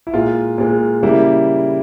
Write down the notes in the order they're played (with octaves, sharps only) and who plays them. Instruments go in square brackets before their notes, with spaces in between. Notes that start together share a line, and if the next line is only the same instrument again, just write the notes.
[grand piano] E4
A#2 G#3 F4
A#2 G#3
C#3 G3 A#3 E4